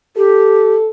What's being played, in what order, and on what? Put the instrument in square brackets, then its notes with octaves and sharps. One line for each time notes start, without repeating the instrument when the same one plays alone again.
[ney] G4 [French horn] A4